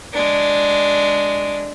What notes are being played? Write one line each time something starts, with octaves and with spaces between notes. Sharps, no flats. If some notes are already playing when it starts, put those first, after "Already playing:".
G#3 D4